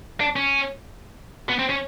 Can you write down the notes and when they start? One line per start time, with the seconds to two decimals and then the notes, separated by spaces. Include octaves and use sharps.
0.20 D4
0.36 C#4
1.49 B3
1.59 C4
1.69 C#4